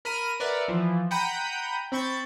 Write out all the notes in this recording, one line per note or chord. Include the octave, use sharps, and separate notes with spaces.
A#4 B5 F6 D#7
A#4 B4 D5 E5 F#5
E3 F3
F#5 G5 A#5 B5 G6 D#7
C4 B5 C#6 G6 A6